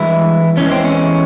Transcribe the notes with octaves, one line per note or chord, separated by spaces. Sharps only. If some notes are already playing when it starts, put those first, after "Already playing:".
Already playing: G2 E3 G#3 E4
E2 E3 G#3 C#4
C4
C#4